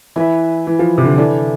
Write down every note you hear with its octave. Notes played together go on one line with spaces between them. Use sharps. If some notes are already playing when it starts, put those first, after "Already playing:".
E3 E4 B4 E5
E3
F3
C3
D3
E3 A3 D4 A4